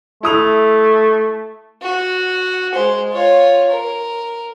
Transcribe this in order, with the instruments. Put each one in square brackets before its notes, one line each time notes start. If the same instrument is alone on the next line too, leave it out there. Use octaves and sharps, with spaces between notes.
[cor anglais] A3 [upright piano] E4 D#6 F7
[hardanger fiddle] F#4
G#3 C5
F4 C#5
A#4